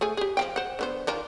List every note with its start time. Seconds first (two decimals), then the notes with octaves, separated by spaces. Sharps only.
0.01 A3 G#4 G#5
0.17 G4 G#4
0.37 F3 F5 G5
0.56 C5 F#5
0.79 D3 B3 C5
1.07 D#3 D4 F4